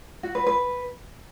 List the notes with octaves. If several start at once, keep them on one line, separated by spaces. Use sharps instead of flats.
F#4
B4
B4